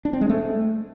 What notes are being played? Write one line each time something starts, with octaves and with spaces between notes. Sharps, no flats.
D4
C4
G#3
A3